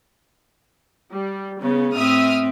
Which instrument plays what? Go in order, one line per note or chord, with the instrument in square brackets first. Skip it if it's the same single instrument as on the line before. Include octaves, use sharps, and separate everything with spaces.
[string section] G3
[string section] C#3 [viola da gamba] B3
[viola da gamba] A2 C4 [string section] E5 D#6 F6